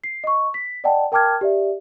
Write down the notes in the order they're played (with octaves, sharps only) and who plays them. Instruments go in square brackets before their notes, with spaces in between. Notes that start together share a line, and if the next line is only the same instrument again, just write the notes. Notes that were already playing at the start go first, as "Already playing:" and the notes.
[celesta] C7
D#5 C#6
B6
D5 D#5 F#5 G5 A5
A#4 G5 A5 D6 F6 G#6
G4 D5 E5